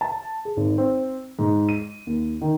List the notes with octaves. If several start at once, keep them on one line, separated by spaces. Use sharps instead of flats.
A5
G#4
G#1
C4
G#2
D#7
D#2
D#3